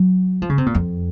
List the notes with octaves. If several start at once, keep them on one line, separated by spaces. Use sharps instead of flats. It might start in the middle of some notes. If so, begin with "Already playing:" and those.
Already playing: F#3
F3
C#3
C3
A#2
F2